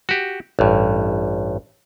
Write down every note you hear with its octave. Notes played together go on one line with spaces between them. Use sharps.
F#4 G4
A1 G2